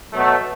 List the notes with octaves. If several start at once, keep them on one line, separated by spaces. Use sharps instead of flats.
B2 F#3 A3